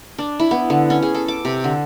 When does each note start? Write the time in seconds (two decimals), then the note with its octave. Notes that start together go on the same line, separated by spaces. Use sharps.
0.18 D4
0.40 E4
0.51 B3
0.70 D3
0.90 C#4
1.03 G#4
1.15 A4
1.28 D6
1.45 C3
1.64 D3